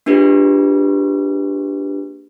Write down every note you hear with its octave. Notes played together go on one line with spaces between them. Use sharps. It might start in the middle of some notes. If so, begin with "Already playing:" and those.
A#3 D4 F4 G4 G#4 B4